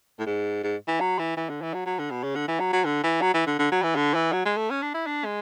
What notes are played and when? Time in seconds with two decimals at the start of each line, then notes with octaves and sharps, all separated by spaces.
0.19 A2
0.26 G#2
0.64 G#2
0.88 E3
1.00 F#3
1.19 E3
1.37 E3
1.50 D3
1.62 E3
1.74 F#3
1.86 F#3
1.99 D3
2.11 B2
2.24 C#3
2.36 D3
2.48 E3
2.60 F#3
2.73 F#3
2.85 D3
3.03 E3
3.22 F#3
3.34 E3
3.47 D3
3.59 D3
3.72 F#3
3.83 E3
3.96 D3
4.14 E3
4.33 F#3
4.45 G#3
4.57 A3
4.70 C#4
4.82 D4
4.95 E4
5.07 D4
5.25 G#3